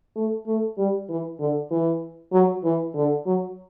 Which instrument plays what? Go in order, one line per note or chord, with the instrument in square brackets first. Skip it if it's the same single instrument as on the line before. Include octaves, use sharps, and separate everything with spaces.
[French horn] A3
A3
G3
E3
D3
E3
F#3
E3
D3
F#3